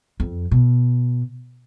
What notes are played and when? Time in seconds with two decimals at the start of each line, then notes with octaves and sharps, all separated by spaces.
0.20 F2
0.51 B2